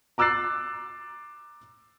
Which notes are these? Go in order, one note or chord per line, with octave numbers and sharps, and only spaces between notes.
A#5 D6 E6 F#6 A6 C7